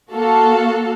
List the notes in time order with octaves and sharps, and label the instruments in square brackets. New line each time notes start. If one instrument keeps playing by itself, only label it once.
[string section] A#3 F#4 A4 F5